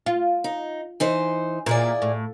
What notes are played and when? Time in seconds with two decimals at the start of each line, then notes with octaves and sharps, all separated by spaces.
0.06 F4
0.44 D#4
1.00 E3 D#4 C5
1.66 A#2 E4 G#4 D5
2.02 A2